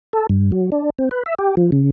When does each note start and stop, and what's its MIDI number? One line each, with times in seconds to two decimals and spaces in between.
0.13 0.27 69
0.29 0.51 43
0.52 0.70 54
0.72 0.90 62
0.98 1.09 60
1.11 1.23 71
1.26 1.35 76
1.39 1.55 67
1.57 1.71 53
1.72 1.90 49